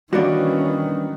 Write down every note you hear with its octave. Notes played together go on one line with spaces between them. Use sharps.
G2 D#3 E3 A#3 C#4 D4 F#4